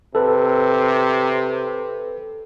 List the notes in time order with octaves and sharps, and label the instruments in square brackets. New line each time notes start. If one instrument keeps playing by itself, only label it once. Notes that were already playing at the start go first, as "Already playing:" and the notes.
[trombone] C3 [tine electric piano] A4 B4